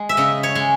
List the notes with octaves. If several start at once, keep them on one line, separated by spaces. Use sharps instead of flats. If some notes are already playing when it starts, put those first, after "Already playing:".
Already playing: G#3
E5
C#3 D#5
C#5
G#3